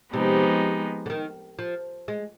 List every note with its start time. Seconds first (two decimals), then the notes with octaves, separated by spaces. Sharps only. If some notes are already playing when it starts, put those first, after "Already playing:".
0.13 C3 F3 G#3 B3 D#4 G4
1.06 D3
1.10 D#3
1.59 F3
2.08 G#3